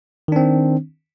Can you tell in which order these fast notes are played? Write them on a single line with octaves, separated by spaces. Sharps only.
D#3 D4 C4